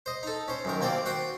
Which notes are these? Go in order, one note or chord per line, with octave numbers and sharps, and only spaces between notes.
C5 D#5
D#4 A4
C#4 C5
F#2 D#3 A#4
D#2 A#3 C4 C5 D5
F#4 C5 G5 C6